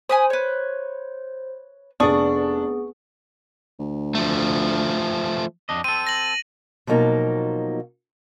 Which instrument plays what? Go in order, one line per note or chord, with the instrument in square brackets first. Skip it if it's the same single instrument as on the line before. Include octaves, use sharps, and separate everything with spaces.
[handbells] C5 [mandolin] G#5 B5 D#6
[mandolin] B4 C#5
[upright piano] F1 D4 [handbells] B3 G#4 [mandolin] C#6 D#6
[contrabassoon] D2
[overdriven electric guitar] F3 A3
[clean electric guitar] F2 D4 D#5
[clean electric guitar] C4 A4 [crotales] D#7
[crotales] A#6 F#7
[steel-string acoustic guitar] B2 F3 F#3 A#3 D#4